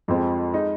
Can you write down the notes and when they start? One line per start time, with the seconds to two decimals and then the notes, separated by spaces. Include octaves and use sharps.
0.08 F2 F3 G#3 C4
0.53 G#3 D#4